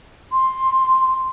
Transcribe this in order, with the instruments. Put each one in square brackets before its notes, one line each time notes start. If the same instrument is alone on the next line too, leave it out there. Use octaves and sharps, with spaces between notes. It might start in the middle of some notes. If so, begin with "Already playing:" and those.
[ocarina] C6